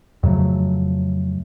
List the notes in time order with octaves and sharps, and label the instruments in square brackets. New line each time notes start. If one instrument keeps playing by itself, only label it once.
[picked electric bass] F2 C#3 F#3 A3